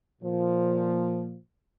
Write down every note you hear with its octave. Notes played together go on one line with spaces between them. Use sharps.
A#2 F3